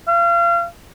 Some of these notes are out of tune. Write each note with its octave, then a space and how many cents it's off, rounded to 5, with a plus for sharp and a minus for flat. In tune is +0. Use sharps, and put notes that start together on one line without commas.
F5 -35